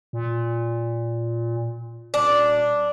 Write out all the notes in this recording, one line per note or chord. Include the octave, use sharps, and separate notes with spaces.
A#2
D#1 D4